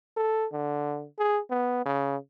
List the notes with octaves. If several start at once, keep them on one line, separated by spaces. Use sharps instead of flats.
A4
D3
G#4
B3
C#3